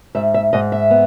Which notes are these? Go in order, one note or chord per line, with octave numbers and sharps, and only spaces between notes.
G#2 E5
E5
G#2 D#5
E5
B3